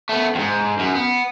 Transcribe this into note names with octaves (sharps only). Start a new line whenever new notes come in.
A3 B3
F2 G#2
F#2
B3